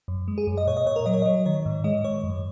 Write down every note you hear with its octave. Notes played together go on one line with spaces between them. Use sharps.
F#2
G#3
G#4
F#2
D#5
A#2 C#5
D#5
A#2 C#5
A#4
F#3 D#5
C#5
F#3 D#5
D#3 C#5
G#2
G#3 D#5
G#2 C#5
F#2